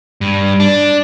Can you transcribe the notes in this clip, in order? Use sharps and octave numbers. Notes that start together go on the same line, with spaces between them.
G2
D4